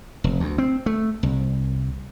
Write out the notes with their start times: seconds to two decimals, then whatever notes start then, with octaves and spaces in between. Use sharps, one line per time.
0.24 F1
0.40 D2
0.58 C4
0.86 A3
1.23 C2